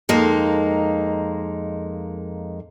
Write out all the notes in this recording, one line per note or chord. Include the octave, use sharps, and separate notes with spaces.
F2 G#3 A#3 D#4